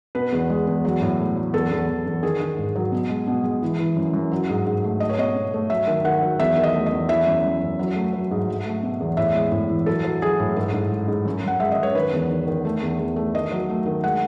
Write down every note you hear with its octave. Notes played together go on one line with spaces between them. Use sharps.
B2 B4
E2
G#3
E2
F#3
A2
A3
F#3
E2 A4
E2
E2
E2
D#3 G#4
D#3
G#2
F#3
B2
G#3
B2
G#3
E3
E3
F#2
F#2
F#3
G#2
G#2
A3
A3 D#5
C#5
B2 D#5
B2
A3
F#3 E5
D#3
D#3 F#5
F#3
E2 E5
D#3
D#5
A3
D#5
E2
E3 E5
F#2
F#2
F#2
F#3
A3
F#3
G#2
F#3
A3
B2
E2
A2 E5
G#3
A2
E3
F#3 A4
F#3
F#3 G#4
A2
G#2 A4
G#2
G#3
G#2
F#2
F#2 F#5
G#3 E5
D#5
F#2 C#5
D#3 B4
E2
D#3
D#3
A3
E2
E2
A3
D#3 D#5
F#3
A3
D#3
G#3 F#5